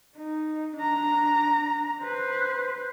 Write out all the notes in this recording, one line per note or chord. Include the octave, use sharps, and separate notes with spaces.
D#4
D4 A#5
B4 C5